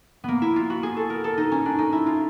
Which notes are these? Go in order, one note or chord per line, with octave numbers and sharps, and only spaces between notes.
A#3 B3
E4
F4
F#4
G#4
A4
A#4
A4
D#4
C#4
D4
D#4
E4
F4